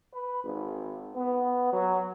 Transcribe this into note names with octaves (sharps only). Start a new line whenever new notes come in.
B4
G#1
B3
F#3